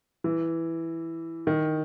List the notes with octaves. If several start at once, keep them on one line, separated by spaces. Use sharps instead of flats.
E3
D#3